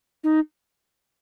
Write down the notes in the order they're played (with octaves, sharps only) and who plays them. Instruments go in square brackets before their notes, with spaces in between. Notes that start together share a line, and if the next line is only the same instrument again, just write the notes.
[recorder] D#4